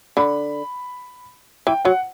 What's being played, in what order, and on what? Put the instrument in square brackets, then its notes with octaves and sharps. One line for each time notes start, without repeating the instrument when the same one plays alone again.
[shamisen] D3 [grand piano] B5
[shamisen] E3 [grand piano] G5
[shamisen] F#3 [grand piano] F#5